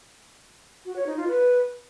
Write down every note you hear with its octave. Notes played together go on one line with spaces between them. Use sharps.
F#4
C#5
D#4
F4
B4